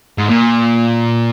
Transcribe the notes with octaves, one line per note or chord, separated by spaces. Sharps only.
G#2
A#2